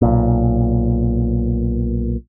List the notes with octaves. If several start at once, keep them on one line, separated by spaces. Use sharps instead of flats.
B1 A#2